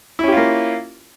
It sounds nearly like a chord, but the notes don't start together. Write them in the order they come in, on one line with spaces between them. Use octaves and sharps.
E4 C#4 G4 F4 A#3